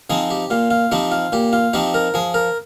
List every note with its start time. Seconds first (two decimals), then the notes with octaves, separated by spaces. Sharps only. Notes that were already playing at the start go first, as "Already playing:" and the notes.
0.10 F3 C4 D#4 G#4
0.31 G4
0.50 A#2 F4
0.71 F4
0.92 F3 C4 D#4 G4
1.12 F4
1.32 A#2 G4
1.53 F4
1.73 F3 C4 D#4 G4
1.94 A#4
2.14 F3 G#4
2.34 A#4